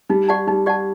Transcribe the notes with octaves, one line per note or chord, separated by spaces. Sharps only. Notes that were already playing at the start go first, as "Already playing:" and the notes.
G3 D#4
G4 D5 F#5 A5
G3 D#4
G4 D5 F#5 A5